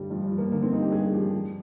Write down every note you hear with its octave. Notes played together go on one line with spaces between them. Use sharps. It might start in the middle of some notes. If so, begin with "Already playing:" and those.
Already playing: G2 D3 G3
G2 F3
G3
F3
A#3
D3 A#3
C4
G2 D#4
G4
G2 G#4
F3 G4
F3